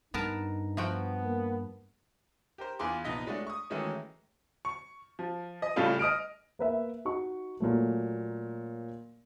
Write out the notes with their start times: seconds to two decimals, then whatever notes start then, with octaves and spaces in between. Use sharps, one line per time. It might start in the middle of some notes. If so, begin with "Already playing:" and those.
0.14 G2 B3 D#4 A#4 A5
0.77 F3 B3 F#4 G5
1.23 A#3
2.58 G4 A#4 C5
2.79 E2 B3 F4 G#4 C6 D6
3.04 A#1 C3 B3 D#4 D#5 B6
3.26 F#3 G#3 A3 D4 F#4
3.47 C#6 D#6
3.70 D#3 E3 F#3 G#3 A3 C#4
4.65 C#6
5.19 F3
5.62 D#5
5.76 A2 C#3 G3 F4 A4
5.99 D#5 D#6 F6 D7
6.59 A#3 B4 E5
7.05 D#4 F#4 C#6
7.60 A#2 F#3 A3